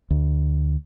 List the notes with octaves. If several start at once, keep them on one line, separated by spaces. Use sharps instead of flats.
D2